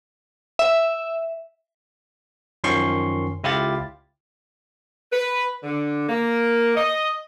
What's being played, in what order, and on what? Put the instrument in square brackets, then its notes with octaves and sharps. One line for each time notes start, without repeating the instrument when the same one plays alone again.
[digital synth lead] E5
[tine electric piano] F#2 D#3 F3 C#4 C6 C#6
C#2 E4 F4 G4 F5 A6
[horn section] B4
D3
A#3
D#5